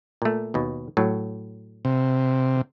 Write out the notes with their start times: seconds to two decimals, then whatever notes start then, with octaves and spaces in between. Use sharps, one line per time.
0.22 A#2 A3
0.54 D#2 B2
0.97 A2 F#3
1.85 C3